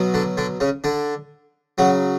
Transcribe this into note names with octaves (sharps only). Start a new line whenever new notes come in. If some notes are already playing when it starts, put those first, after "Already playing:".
Already playing: B2 F#3
D3 D4
D3 D4
C#3 C#4
D3 D4
C#3 F#3 F#4